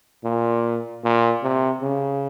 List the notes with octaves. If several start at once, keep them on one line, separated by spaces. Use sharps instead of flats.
A#2
A#2
C3
C#3